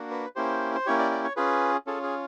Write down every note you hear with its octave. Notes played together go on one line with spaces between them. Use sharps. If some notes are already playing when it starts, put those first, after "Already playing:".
Already playing: A#3 D4 F#4
B4
A#3 C#4 E4 G4 C5
C5
A#3 C#4 E4 G4 C#5
D5
D5
C#5
C#4 F4 G#4 B4
C#4 F4 G#4 A4
G#4